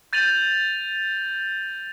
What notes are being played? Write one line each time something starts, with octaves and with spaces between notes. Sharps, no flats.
G6 A6 D#7 F7 F#7